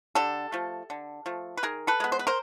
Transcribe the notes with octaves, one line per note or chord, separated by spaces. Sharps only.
D3 G4 A4
F3 A3
D3
F3 A3
B4
D#3 G#4 A#4
A4 B4
G#3 B3
C5
B4
A#4 C5